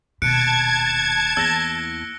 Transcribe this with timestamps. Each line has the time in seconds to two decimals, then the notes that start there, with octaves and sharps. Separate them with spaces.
0.22 D#1 B2 A5 F#6 G#6 C#7 D7
1.37 E2 A#3 E6 A#6